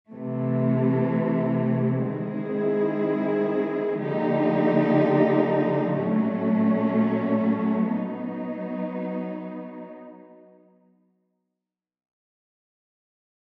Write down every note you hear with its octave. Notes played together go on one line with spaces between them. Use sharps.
C3 E3 A3
D#3 G#3 C4 E4 G#4
D3 F3 A#3 D#4 G4
A#2 F#3 A3 C#4
F#3 B3 D#4